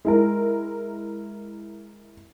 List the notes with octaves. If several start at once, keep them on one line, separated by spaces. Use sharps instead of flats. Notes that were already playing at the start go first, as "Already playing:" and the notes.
G#3 E4 A#4